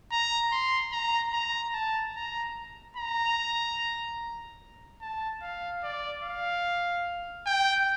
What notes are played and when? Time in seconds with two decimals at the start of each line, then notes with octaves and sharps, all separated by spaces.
0.12 A#5
0.52 C6
0.93 A#5
1.33 A#5
1.74 A5
2.16 A#5
2.97 A#5
5.02 A5
5.42 F5
5.83 D5
6.23 F5
7.46 G5